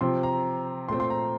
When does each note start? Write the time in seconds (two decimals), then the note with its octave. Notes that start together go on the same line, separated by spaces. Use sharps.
0.01 C3 F3 C4 C6
0.23 A#5
0.88 A#2 A3 C4 C6
1.00 C6
1.10 A#5